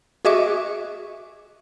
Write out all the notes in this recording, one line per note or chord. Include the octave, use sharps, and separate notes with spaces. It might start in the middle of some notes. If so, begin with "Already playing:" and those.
F#4 G#4 D#5 E5 C#6 D6